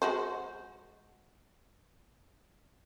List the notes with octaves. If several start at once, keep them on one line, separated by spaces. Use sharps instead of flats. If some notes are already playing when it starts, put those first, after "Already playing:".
G#3 F#4 C5